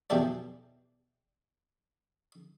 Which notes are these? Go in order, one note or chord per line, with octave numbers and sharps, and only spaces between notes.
B1 E2 A2 A3 G4 D5